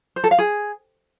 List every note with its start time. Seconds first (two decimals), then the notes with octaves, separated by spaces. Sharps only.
0.16 C5
0.24 A4
0.31 F5
0.39 G#4